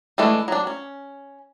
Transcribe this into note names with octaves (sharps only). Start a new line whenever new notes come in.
E3 G#3 A3 D4
F#3 D4
C#4